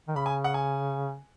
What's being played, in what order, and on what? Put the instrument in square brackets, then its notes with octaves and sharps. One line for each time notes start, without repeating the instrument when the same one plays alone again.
[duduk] D#3
[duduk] C#3 [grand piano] B5
[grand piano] G#5
F#5
G#5